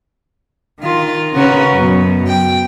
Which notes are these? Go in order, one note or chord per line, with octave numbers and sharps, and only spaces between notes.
D#3 F4
C#3 C#4 F#4 A#4 B4
F#2 B2
G5